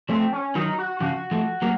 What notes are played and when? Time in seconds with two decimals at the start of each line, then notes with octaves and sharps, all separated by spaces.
0.09 F3 A3 C4
0.33 C#4
0.55 D#3 F#3 D#4
0.79 F#4
1.01 C#3 F3 F#4
1.31 F3 A3
1.62 F#3 A#3